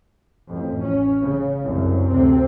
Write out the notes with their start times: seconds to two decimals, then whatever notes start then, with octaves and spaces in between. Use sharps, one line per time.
0.47 A1 F2
0.82 C#4
1.21 C#3
1.64 C2 F#2
2.08 D2 C3 C4